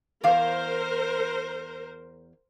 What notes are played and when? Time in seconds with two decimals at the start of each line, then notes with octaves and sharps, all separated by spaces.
0.24 E2 A#4 C5 F5